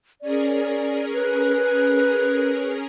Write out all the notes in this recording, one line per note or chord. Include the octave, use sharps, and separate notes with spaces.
C#4 G#4 A#4 D5
B4